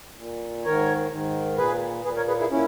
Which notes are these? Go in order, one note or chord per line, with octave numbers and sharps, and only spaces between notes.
A#2
G#2 D#3 A#4 C#5
G#2 D#3
A#2 G#4 B4
A#2 G#4 B4
A#4 C#5
G#4 B4
E4 G#4
A#2 C#4 E4